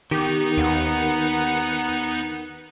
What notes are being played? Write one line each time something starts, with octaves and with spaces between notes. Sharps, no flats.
D#3 B3 D#4 G4
D#2 B4 F#5